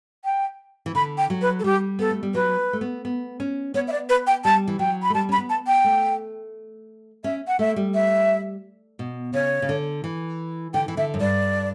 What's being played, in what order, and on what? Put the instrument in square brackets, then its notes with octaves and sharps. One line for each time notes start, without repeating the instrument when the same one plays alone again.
[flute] G5
[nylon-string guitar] E3
[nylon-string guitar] D3 [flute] B5
[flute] G5
[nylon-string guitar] F#3
[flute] B4
A4
[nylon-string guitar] G3 [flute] G4
[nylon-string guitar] B3 [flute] A4
[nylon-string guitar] A3
G3
[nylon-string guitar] F#3 [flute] B4
[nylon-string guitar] A3
B3
B3
C#4
[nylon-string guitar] B3 [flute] C#5
[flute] E5
D5
B4
G5
[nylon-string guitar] G3 [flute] A5
[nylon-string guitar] E3
[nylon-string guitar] F#3 [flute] G5
[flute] B5
[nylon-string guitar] A3
[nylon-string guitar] G3 [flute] A5
[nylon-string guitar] C#4 [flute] B5
[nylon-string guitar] B3
[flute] A5
G5
[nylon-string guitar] A3
[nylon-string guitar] C#4 [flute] E5
[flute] F#5
[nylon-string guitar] A3 [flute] E5
[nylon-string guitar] G3
[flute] E5
[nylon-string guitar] B2
[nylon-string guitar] C#3 [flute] C#5
[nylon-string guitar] C#3
D3
E3
[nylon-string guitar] D3 [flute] G5
[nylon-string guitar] E3
[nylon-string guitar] D3 [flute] E5
[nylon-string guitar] F#2
[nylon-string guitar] G2 [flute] D5